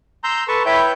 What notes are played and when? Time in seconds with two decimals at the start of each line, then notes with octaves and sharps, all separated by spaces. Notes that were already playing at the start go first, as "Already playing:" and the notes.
0.24 A#5 C6 E6 G6
0.48 A4 B4 A5 C#6
0.66 E4 B4 C#5 E5 G5 G6